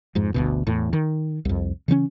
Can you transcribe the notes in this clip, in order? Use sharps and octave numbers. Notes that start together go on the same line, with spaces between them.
F2 G#2
G1 D2 B2
E2 A2
D#3
C2 F2
C#3 E3 F#3 C#4